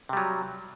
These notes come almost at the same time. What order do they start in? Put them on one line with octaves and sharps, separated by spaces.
C3 G3 F#3